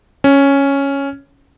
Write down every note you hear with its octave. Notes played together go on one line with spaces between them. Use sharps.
C#4